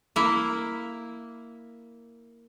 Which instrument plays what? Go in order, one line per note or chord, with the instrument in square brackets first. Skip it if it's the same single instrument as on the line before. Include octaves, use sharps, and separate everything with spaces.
[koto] A#3 E4